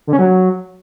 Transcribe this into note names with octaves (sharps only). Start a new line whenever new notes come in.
D3
C#4
F#3